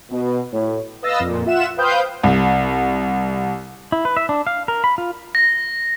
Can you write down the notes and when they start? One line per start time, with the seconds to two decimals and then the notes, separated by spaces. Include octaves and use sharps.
0.11 B2
0.52 A2 C#5
1.02 B4 D#5 F5 E6 A6 A#6
1.20 F2 A#2
1.46 F4 E5 F#5 E7
1.77 B4 C5 F5 G5 D#6 G6
2.23 C2
3.92 E4
4.05 B4
4.17 E5
4.29 D4
4.47 F5
4.68 A#4
4.84 B5
4.98 F4
5.35 A#6